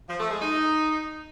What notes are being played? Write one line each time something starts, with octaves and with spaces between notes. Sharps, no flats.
F3
A3
G#3
D#4